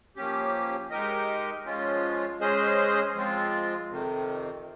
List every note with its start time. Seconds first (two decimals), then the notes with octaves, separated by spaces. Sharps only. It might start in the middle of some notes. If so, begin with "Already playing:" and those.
0.16 F3 A#3 C#4 G4
0.90 G#3 D#4 G4 A#4 D#5
1.65 F3 G#3 C#4 F4
2.40 G#3 C#4 G#4 C5 D#5
3.15 F3 G#3 C4 F4
3.90 F2 C3 D#3